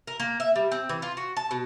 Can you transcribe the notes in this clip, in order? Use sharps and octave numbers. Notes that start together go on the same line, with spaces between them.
A#4
A#3
E5
G3
C4
E3
F4
F#4
A5
B2